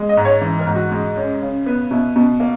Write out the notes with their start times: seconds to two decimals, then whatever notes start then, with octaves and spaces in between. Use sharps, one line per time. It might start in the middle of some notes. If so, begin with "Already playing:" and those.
Already playing: G#3
0.09 D#5
0.17 G#2
0.25 C#5
0.41 E3
0.59 A#4
0.67 G#2
0.75 F#4
0.91 G#3
1.16 F#2
1.42 C#3
1.66 B3
1.91 B2 E4
2.16 B2
2.40 A#3